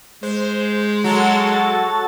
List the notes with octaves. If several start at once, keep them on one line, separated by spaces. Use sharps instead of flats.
G#3 C5
F#3 F#4 A4 A6